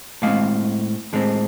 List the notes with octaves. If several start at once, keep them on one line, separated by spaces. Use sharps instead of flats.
A2 G#3 C4 F5
A2 G#3 C4